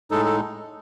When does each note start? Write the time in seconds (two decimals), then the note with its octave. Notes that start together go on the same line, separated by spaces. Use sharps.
0.11 A2 G#3 D#4 A4
0.25 A4